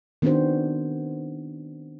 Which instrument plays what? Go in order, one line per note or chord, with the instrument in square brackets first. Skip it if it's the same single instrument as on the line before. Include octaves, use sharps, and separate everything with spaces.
[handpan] D#3 B3 C4 D4 F#4 C5